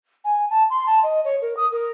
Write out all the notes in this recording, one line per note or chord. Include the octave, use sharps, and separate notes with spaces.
G#5
A5
C6
A5
D#5
C#5
A#4
D#6
A#4